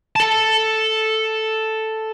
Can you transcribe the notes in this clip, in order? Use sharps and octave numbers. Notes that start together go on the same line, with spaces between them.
A4 A5